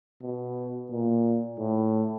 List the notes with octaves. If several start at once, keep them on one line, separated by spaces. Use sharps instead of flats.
B2
A#2
A2